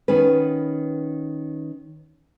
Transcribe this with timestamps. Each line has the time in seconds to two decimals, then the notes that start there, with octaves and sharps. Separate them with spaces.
0.08 D#3 B3 C#4 B4